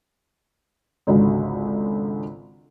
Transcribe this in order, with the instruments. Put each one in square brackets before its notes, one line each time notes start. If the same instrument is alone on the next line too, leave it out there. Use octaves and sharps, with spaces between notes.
[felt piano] G#1 C#2 D3 F#4